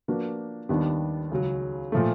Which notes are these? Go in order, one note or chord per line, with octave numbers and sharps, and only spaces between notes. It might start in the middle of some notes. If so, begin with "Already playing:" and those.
F3 A#3 D4 F#4 B4
D#2 D#3 G3 B3 D4
C#2 C#3 F#3
A#2 F3 A3